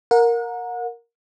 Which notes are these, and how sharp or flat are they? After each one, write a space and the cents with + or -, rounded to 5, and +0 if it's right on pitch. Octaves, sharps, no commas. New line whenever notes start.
A#4 +0 F#5 -35